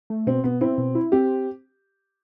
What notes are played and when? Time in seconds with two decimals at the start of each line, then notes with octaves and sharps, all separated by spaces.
0.10 A3
0.27 B2 C4
0.44 B2 B3
0.61 C4 E4
0.78 B2
0.95 E4
1.12 C4 G4